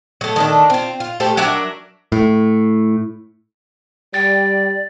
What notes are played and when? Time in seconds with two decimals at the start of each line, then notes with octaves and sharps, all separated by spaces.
0.21 F#3 A3
0.36 D#3 A3 D4
0.70 C4 F4
1.00 F4
1.20 A3 G4 A4 C5
1.37 F#3 D4 A#4 E5
2.12 A2
4.14 G3 D5 G5 A6